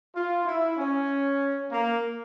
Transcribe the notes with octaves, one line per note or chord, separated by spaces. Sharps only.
F4
E4
C#4
A#3